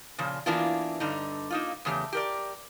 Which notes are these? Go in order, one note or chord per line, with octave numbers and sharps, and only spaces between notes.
A#2 C#3 F3
E3 A#3 B3 D4 E4 F4
G2 D3 D#4
A#3 D#4 F4
E2 C#3 A3 G4
G4 A#4 D5